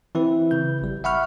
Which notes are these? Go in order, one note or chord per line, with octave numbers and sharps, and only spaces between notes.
E3 C4 E4 B4
C#3 G6
G#1 G3
E5 F#5 B5 C#6 F6